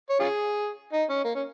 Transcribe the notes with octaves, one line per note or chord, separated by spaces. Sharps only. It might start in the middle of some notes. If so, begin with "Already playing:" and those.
C#5
C#4 F4 G#4
D#4
C#4
A#3
C#4